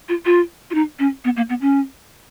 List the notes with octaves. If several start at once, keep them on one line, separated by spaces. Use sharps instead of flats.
F4
F4
F4
D#4
C#4
B3
A#3
B3
C#4